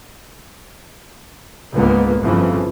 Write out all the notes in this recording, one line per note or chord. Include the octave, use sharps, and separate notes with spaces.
C#2 G#2 D3 A#3 B3
G1 F2 C#3 E3 F3